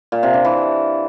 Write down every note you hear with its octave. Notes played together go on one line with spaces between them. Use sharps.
A#2
C3
D4
E3